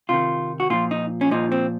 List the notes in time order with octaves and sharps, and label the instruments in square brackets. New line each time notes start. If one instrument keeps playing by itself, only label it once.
[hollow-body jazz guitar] C3 D#3 F4
F#4
A#2 F3 F4
D#4
C#4
A#2 F3 D#4
C4